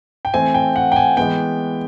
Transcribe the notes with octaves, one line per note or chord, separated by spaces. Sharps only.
G5
E3 A3 C4 G#5
G5
F#5
G5
G#5
E3 G#3 B3 G5